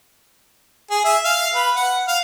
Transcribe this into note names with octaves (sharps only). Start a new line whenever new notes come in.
G#4
E5
F5
B4
F#5
F5